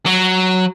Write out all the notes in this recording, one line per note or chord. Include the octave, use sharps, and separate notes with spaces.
F#3